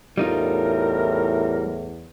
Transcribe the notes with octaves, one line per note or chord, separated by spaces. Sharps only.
E2 A2 G3 D#4 F4 A#4